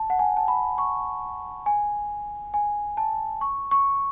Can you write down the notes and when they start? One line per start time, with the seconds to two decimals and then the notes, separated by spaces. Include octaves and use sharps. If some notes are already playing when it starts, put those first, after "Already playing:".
Already playing: A5
0.10 F#5
0.19 G#5
0.37 A5
0.48 B5
0.78 C#6
1.66 G#5
2.54 G#5
2.97 A5
3.41 C#6
3.71 C#6